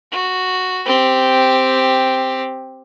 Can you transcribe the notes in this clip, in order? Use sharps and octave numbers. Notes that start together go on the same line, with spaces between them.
F#4
C4 G4